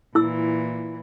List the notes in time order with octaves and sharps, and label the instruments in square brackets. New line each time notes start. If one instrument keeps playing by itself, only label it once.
[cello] A#2 E3 [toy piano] E4 E6